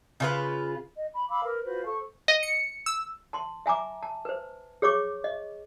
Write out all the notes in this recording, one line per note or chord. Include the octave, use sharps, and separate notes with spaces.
C#3 F4 B4
D#5
B5
F5 B5 D6 E6
A#4 B4
F4 F#4 B4 C5
A4 C5 C#6
D#5
C#7
E6
A5 C6
E5 G#5 A#5 D6
A5
B4 C5
G#4 C#5 C#6 D6
D#5